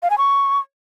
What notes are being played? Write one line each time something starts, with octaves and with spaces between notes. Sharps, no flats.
F5
G#5
C#6